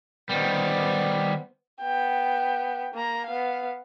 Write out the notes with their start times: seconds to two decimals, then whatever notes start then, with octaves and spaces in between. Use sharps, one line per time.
0.30 D#3 G3 B3 C5
1.81 B3 G5
2.94 A#3 A#5
3.26 B3 F5